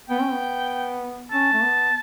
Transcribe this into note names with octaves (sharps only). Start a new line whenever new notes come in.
B3 G5
C#4
B3
C#4 A5
A3
B3